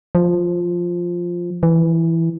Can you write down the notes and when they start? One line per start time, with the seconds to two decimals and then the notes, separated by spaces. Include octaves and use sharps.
0.15 F3
1.63 E3